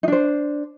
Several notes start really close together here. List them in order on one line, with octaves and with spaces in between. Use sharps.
D#4 D4 C5